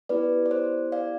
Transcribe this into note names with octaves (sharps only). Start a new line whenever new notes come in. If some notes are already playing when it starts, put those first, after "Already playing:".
B3 E4 G4 B4 D5
D5
C5
D5 F5